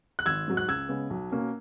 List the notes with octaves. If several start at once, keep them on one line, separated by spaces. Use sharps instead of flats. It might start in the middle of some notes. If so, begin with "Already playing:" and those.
F#6
G#1 E6 G#6
G#2 F#3
F#6
C#2 E6 G#6
C#3 G#3 B3
B1
B2 A#3 C#4